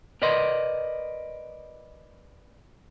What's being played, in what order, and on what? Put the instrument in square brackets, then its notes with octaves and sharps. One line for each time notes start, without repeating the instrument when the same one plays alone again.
[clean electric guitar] A#4 B4 D5 D#5 C6